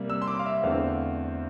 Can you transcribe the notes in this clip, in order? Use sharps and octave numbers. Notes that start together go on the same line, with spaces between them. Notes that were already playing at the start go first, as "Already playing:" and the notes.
Already playing: C3 G3 A#3
E6
C6
D6
F5
E5
E2 D3 A3 C4 F5